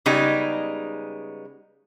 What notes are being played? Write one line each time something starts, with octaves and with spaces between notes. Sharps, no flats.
C#3 G3 G#3 B3 D#4